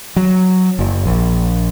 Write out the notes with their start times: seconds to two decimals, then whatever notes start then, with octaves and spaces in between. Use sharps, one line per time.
0.16 F#3
0.79 F#1
1.05 A#1